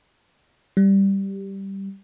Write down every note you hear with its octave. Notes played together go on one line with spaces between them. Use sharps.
G3